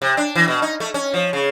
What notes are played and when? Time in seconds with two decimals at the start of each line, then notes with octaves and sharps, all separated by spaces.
0.02 C3
0.17 D4
0.35 E3
0.48 B2
0.62 D#4
0.80 A3
0.94 C#4
1.14 F3
1.33 C#3